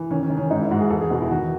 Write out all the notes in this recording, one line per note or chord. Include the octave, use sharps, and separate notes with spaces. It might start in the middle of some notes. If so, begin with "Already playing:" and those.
Already playing: E3
D#3 C#4
C#4
D#3
C#4
G#2 D#4
E4
G#2 F#4
G#4
E2 A4
G#4
B2 F#4
E4
D#3 F#4